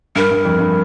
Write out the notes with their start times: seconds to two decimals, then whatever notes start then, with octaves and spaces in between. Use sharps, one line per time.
0.16 G2 A#4
0.31 G2
0.45 F2
0.59 G2